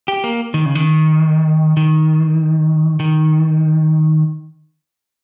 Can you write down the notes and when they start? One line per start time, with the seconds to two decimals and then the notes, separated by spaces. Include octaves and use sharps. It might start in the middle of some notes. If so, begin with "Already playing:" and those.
0.08 G4
0.24 A#3
0.54 D#3
0.66 C#3
0.75 D#3
1.77 D#3
3.00 D#3